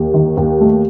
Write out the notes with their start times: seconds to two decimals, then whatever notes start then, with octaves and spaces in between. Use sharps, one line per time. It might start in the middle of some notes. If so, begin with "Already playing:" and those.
Already playing: D#2
0.14 D#3
0.37 D#2
0.61 A3